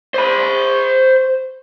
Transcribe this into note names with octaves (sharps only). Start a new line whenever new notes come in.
C5 B5